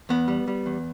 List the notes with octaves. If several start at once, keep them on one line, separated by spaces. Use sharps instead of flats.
E2 B3
G3
G3
E2